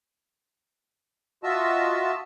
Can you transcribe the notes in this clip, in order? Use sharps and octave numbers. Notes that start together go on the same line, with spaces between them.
F4 F#4 D#5 E5 A5 E6